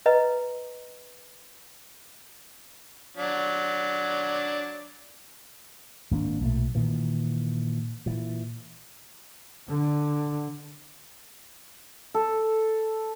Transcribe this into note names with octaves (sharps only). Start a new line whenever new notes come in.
B4 D#5 A#5
F#3 D4
G#1 A#3 C#4 D4
B1 A#2 G3 A3
A#2 D#3 E3
A#2 E3
D3
A4